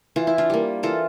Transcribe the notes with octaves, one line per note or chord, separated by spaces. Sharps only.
E3 F4
E4
D4 F4
G3 A#3
E3 F4 A4